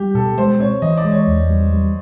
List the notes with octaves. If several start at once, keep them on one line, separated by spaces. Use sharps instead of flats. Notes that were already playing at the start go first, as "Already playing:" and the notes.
Already playing: G3 G4
B2 A4
G#3 C5
C4 C#5
E3 D#5
D5
G#3
C#5
E2
G3
G3